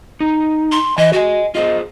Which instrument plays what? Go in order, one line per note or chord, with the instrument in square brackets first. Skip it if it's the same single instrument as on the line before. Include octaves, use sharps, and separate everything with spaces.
[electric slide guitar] D#4
[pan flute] C6
[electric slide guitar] E3 G#5 [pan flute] D#5
[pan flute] F#4 [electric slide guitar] D#5 G#5
[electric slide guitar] F4 G#4 C5 [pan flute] D#5